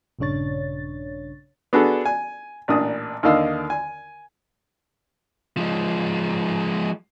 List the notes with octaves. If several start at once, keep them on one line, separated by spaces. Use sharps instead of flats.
A#1 G2 C#3 D4 C#5 A6
B3 D4 F#4 G#4 A4
G#5
A1 A#2 D4 D#6
D#2 D3 D#3 D#5 F5 E6
G#5
F3 G#3